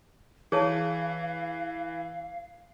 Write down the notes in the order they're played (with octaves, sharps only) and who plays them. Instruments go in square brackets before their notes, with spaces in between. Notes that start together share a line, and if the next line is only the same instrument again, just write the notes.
[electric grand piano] E3 [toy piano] G#4 C#5 A5 [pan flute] F5